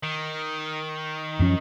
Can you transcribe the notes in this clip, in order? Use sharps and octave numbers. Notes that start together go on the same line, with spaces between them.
D#3
F#2 F3 C#4